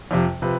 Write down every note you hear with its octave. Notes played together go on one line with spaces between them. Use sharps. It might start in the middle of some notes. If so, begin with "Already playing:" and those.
F2 C3 F3
C3 F3 B4